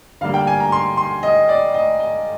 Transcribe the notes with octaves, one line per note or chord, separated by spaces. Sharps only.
D3 G3 A#3 F5
G5
G#5
A#5
C6
C6
D#5
D5
D#5
D#5